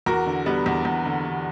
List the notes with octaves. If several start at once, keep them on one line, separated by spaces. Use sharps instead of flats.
E2 F#4 A#4
D3
D3 G3 B3
E2
E2
D3
D3